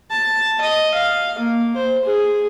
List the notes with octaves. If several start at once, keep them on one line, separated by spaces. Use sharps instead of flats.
A5
D#5
F5
A#3
C5
G#4